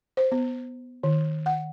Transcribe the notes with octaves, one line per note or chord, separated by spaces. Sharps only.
C5
B3
D#3
F#5